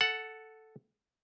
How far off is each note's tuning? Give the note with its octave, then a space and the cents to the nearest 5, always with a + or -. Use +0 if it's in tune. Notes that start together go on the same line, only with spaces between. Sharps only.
A4 +0 F#5 +0